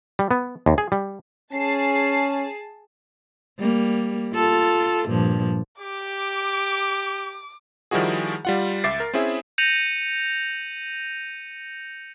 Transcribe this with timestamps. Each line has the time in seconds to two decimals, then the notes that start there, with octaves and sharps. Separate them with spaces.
0.19 G3
0.31 B3
0.66 D#2
0.78 G#4
0.92 G3
1.53 C#4 G#4 A5 C7
3.59 G3 A#3
4.33 F4 A4
5.07 G2 A#2 F3
5.81 G4 D6
7.91 D#3 F3 G3 E4 F#4 G#4
8.45 G3 F4 F#5
8.84 C#2 E5 D6 A6 C7
9.00 A#4
9.14 C4 C#4 E4 G#4 E5
9.58 G6 A#6 C#7 D#7 F7 F#7